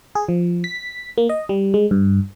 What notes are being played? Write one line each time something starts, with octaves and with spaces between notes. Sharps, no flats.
G#4
F3
B6
A#3
D#5
G3
G#3
G2